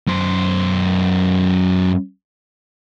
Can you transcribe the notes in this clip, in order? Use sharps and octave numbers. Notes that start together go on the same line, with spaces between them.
F#2 C5